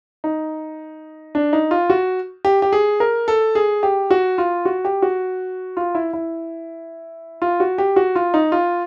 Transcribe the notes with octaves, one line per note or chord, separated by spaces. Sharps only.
D#4
D4
D#4
F4
F#4
G4
G4
G#4
A#4
A4
G#4
G4
F#4
F4
F#4
G4
F#4
F4
E4
E4
F4
F#4
G4
F#4
F4
D#4
F4